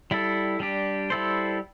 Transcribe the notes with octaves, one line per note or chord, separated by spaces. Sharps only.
G3 E4 A4
G3 D4 G4
G3 E4 A4 C5